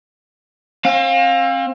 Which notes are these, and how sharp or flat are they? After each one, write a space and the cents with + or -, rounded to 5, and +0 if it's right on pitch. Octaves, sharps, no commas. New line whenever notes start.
C4 +40 F5 +20